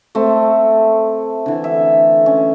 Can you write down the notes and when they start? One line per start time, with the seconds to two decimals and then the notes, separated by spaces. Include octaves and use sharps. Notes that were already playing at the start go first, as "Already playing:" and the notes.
0.15 A3 C4
1.46 D3 E3
1.64 E5
2.26 C#4